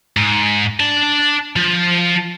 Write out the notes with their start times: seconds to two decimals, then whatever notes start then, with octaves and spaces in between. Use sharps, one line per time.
0.17 G#2
0.80 D4 A5
1.56 F3